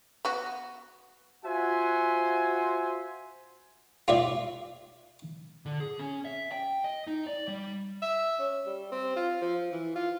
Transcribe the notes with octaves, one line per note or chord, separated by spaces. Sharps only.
B3 F#4
F4 F#4 C5 E5 F#5 G#5
F4 D5 E5
D3
G#4
C#4
E5
G5
D#5
D#4
D5
G3
E5
C#4
G3
C4
F4
F3
E3
F4